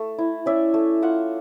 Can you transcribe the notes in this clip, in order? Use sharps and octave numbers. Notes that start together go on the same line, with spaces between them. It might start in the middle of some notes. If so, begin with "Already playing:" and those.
Already playing: A3
E4
C#4 D5 E5
A3
F4 E5 F#5